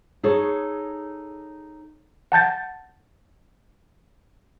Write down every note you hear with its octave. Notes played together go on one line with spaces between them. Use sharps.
D#4 G#4 A4 C#5
F#5 A5 G6 A6